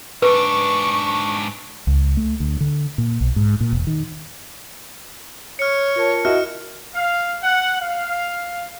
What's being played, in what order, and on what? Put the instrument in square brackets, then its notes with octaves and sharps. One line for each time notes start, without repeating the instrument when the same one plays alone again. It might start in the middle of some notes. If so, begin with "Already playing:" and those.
[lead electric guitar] G#2 D4 [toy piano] B4 [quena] C#6
[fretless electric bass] C#2
A3
D2
D3
A#2
B1
G#2
A#2
E1
D#3
[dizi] C#5 [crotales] F6 C#7
[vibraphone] F4 A#4 A5
[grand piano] E4 F#4 D#5 [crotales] F6
[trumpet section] F5
F#5
F5